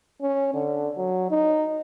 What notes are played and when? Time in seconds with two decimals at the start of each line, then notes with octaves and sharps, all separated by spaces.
0.22 C#4
0.54 D3
0.97 F#3
1.31 D#4